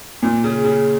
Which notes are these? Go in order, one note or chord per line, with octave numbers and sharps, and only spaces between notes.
A#2
C#3
C#3